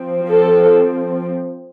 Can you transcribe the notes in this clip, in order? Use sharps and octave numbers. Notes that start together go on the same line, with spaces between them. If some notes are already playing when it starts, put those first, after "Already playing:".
Already playing: F3 C4
A4